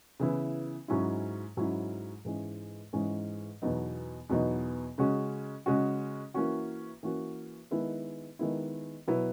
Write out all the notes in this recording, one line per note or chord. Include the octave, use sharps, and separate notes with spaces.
C#3 E3 B3 E4
G#2 F#3 C#4 E4
G#2 F#3 C#4 E4
G#2 E3 G#3 C#4
G#2 E3 G#3 C#4
E2 B2 F#3 B3 D#4
E2 B2 F#3 B3 D#4
C#3 G#3 C#4 F#4
C#3 G#3 C#4 F#4
E3 A#3 C#4 F#4
E3 A#3 C#4 F#4
D#3 G#3 B3 E4
D#3 G#3 B3 E4
B2 F#3 B3 E4